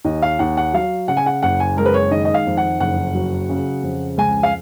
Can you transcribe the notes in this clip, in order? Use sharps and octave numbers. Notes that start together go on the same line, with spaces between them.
D#2 D#5
F5
D#2 F#5
F#5
F#3 F5
C#3 F#5
G#5
F#5
F#1 F#5
G#5
G#3 A#4
B4
C#5
D#3 D#5
D#5
F5
F2
F#5
F#1 F#5
F#3
C#3
F2
C#2 G#5
F5